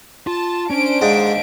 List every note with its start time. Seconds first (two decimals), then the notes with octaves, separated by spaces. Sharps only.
0.27 F4 A5
0.70 C#4 D4 C5 D7
1.02 G#2 D#5 F5